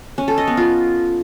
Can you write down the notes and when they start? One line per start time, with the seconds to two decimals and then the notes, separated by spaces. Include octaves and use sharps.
0.18 C#4
0.28 A4
0.38 D#5
0.47 B3
0.57 F4